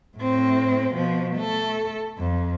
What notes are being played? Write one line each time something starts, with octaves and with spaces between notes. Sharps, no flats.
A2 C4
B2 F3
A3 A4
F2